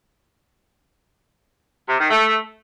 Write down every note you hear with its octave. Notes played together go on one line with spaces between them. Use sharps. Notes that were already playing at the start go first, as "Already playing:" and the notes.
C3
D#3
A3